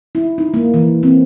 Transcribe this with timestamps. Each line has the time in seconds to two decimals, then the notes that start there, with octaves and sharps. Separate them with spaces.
0.15 E4
0.38 D#4
0.54 A#3
0.74 E3
1.03 C4